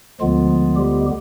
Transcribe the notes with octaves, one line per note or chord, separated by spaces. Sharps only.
D2 D3 F3 G#3 B3 F4
G3 G4